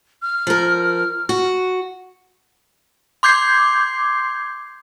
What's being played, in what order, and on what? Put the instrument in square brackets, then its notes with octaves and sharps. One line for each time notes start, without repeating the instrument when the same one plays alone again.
[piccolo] F6
[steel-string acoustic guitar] F3 A#4
F#4
[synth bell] C6 D6 G6 G#6 C7